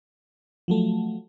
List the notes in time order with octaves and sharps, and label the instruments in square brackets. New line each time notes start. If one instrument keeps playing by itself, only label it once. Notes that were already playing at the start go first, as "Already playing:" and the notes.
[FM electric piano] F3 F#3 A3